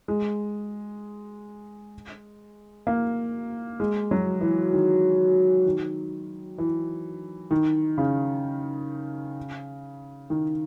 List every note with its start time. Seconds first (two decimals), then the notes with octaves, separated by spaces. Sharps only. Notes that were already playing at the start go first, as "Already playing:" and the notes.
0.08 G#3
2.87 A#3
3.80 G#3
4.11 F#3
4.41 E3
4.73 D#3
5.66 D#3
6.58 E3
7.51 D#3
7.98 C#3
10.30 D#3